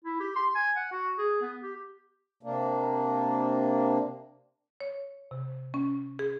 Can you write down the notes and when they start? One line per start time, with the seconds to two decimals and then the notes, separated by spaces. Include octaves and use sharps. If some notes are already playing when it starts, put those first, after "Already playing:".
0.05 E4
0.20 G4
0.36 C6
0.55 G#5
0.76 F#5
0.92 F#4
1.18 G#4
1.42 B3
1.63 G4
2.43 C3 A#3 D4
4.81 C#5
5.31 C3
5.74 C#4
6.19 G#4